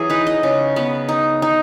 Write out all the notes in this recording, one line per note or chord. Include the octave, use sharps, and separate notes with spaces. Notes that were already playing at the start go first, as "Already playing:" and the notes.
Already playing: E3 F#3 G#4
D#4 B4
D#5
C#3
B3
D#4
D#4